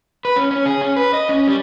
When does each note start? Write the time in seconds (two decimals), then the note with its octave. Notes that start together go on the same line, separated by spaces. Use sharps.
0.25 B4
0.36 C#4
0.51 C#4
0.66 G#4
0.81 C#4
0.96 B4
1.13 D#5
1.29 C#4
1.47 G3